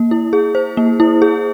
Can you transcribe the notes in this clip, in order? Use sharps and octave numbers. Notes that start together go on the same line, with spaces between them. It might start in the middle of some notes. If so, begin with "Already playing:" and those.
Already playing: A#3
E4
G#4
C5
A#3
E4
G#4